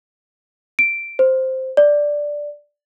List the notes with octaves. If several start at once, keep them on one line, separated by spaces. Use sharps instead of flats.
D7
C5
D5